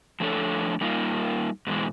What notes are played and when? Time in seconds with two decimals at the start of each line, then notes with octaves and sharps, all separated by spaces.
0.20 F3 A3 D4 A4 C#5
0.81 G3 A#3 D#4 F4
1.67 G#2 B2 E3 G#3